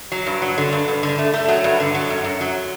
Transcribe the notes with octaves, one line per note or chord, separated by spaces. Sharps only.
F#3
G2
F#3
D3
G2
G2
D3
A3
A3
F#3
G2
D3
F#3
F#2
F#2
F#3